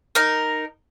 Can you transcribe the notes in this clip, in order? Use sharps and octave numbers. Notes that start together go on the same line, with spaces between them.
D#4 A#4